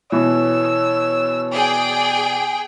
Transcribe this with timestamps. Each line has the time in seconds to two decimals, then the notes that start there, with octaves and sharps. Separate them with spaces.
0.12 B2 E3 C#5 E6
1.52 G#4 D5 G5